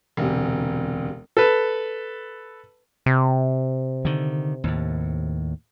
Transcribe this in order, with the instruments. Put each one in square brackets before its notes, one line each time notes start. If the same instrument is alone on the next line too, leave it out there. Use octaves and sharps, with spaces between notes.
[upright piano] E1 D2 C3
[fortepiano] A4 B4
[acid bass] C3
[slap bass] D3 D#3
D#2 A2